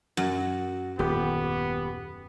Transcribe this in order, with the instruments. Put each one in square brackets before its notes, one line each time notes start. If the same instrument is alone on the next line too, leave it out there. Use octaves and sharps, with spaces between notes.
[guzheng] F#2 [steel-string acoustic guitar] F#4
[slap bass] D#1 [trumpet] B3 [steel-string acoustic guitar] G4